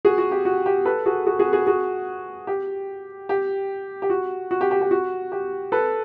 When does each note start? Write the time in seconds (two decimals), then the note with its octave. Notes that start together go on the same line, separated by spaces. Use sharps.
0.05 F#4 G#4
0.18 F#4
0.31 G4
0.45 F#4
0.66 G4
0.85 A4 B4
1.06 F#4 G#4
1.26 F#4 G#4
1.39 F#4 G#4
1.53 F#4 G#4
1.67 F#4 G#4
2.47 G4
3.29 G4
4.02 G4
4.10 F#4
4.51 F#4
4.61 G4
4.71 G4
4.81 G4
4.91 F#4
5.32 G4
5.72 A4 B4